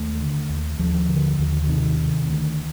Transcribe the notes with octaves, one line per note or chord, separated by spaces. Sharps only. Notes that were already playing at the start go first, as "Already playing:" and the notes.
Already playing: D#2 A3
D3
D#2
D#2 F3
D3
D#2
C3 D#3
C3
D2